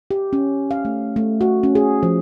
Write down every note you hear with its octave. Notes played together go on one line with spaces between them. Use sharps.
G4
C#4
F5
A3
A3
F#4
C#4
G#4
F3